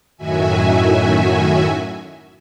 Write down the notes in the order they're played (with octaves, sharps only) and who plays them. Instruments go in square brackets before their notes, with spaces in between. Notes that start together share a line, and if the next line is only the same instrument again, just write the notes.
[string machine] F#2 A2 D#3 F#4 E5 G#5